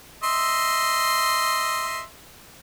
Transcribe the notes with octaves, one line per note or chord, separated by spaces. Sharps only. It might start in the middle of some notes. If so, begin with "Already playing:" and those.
D#5 E5 C6